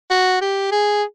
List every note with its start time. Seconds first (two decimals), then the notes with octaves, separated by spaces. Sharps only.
0.11 F#4
0.41 G4
0.72 G#4